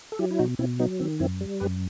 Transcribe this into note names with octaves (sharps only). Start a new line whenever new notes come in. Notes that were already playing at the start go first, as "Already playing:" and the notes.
A4
F#3 E4 G4
E4
B2 D#4 F#4
B2 C4 E4
F#3 B3 D#4
D#3 C4
F#2 C4 E4
G3
F#2 G4 B4